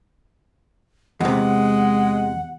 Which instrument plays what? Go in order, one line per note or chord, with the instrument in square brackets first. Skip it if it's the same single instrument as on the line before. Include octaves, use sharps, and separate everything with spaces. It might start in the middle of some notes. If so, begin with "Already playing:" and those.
[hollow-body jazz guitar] E2 C3 [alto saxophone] G#3 [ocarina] F#5